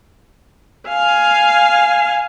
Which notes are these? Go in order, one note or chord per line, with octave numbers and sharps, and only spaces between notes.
F5 G#5